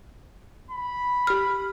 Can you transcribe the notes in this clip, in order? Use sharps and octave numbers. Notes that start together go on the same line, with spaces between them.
B5
G4 F6